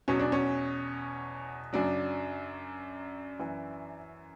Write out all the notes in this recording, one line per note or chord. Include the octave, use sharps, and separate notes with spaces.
E2 B2 F#3 C#4
D4
C#4
F#2 C#3 F#3 D4
F#2 E3